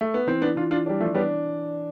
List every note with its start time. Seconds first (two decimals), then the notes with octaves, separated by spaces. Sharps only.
0.01 A3
0.14 B3
0.27 E3 C4
0.42 B3 D4
0.56 E3 D4 F4
0.71 D4 F4
0.86 G3 D4
1.00 F3 A3
1.14 G3 B3 D4